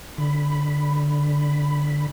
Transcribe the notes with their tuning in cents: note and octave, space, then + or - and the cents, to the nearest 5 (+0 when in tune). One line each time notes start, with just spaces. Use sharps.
D3 +0 B5 +5